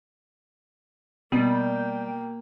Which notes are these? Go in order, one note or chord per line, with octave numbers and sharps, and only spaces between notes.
B2 G3 A#3 G5